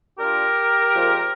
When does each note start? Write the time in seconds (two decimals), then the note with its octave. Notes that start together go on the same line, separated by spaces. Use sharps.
0.18 G3 D4 F4 G4 A#4
0.95 A#2 F3 G#3 C4 F4